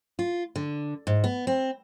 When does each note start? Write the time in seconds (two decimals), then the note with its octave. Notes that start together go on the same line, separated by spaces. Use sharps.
0.19 F4
0.56 D3
1.07 G#2
1.24 B3
1.47 C4